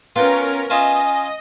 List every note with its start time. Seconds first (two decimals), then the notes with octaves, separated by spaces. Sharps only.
0.16 B3 C#4 F4 A#4 G5
0.70 C#4 F4 D#5 E5 G#5